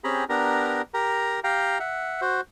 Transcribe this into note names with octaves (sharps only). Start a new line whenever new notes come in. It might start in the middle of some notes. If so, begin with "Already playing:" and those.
C4 C#4 G4 G#4 A#5 B5
B3 D4 G4 A#4 A#5
G4 A#4 A#5
G4 F5 G5 A#5
E5 F#5
F#4 C5